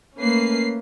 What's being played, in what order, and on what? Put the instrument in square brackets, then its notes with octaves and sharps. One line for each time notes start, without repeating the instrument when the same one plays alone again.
[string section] A3 A#3 C#4 B4 C7